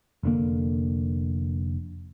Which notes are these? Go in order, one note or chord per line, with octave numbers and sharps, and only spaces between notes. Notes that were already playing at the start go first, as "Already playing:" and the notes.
F1 D3 A#3